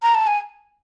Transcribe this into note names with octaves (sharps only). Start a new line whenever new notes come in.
A#5
A5
G#5